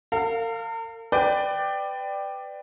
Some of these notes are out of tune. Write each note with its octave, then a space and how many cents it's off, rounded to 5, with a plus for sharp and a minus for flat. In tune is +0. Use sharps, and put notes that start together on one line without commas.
A#4 -45 F5 +0
B4 +25 D5 +15 G5 +0